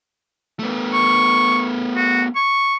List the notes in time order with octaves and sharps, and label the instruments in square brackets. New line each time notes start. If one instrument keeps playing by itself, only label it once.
[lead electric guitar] A3 B3
[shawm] C#6
F#4
C#6